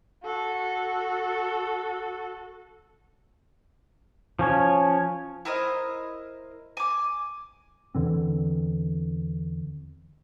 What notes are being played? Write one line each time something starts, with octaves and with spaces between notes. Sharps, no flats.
F#4 A4
F3 C#4 C#5
E4 A#4 C5 D#5
G#5 D6
E2 D3 E3 C4